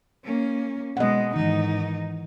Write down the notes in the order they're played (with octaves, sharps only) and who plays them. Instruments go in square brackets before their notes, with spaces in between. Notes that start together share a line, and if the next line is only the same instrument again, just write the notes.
[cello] A#3 C#4
[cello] B2 G#3 [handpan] D#5 F#5
[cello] G#2 D#4 [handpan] D#3 E3